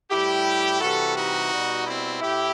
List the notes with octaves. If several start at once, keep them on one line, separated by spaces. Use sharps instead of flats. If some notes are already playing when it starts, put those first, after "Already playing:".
A2 G3 E4 G4
C3 E3 G3 F#4 A4
D#4 F#4
B2 G3
C4 E4
A2 E4 G4